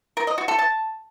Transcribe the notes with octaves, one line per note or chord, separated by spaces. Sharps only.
A#4
D#5
F#4
A4
A5